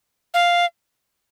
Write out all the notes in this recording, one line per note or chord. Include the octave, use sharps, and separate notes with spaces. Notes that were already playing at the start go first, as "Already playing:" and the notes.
F5